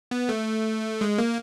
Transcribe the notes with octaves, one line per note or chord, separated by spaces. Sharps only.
B3
A3
G#3
A#3